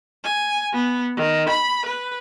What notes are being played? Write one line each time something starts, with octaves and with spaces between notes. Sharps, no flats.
G#5
B3
D#3
B5
B4